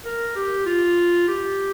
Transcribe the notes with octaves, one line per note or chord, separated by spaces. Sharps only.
A#4
G4
F4
G4